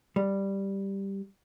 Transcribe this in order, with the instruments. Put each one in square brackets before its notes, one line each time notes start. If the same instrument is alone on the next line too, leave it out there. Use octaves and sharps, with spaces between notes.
[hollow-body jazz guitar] G3